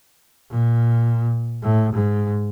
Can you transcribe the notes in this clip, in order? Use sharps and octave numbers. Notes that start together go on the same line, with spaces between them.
A#2
A2
G#2